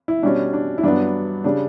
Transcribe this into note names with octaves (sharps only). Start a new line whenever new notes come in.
E4
B2 G3 C#4 D4
D4
E4
G2 F#3 B3 D4
C#3 G3 D4